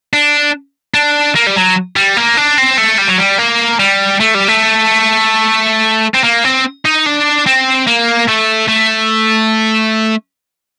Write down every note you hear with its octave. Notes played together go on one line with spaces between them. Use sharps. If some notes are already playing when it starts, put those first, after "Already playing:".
D4
D4
A#3
G3
F#3
G3
A#3
D4
C4
A3
G3
F#3
G3
A#3
G3
A3
G3
A3
C4
A#3
C4
D#4
D4
C4
A#3
A3
A3